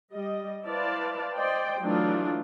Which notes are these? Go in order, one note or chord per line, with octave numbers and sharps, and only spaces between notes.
G3 D#5
E4 B4 C5 D5 F5 A5
C5 D5 D#5 G5
E3 F#3 A3 D4 D#4 F4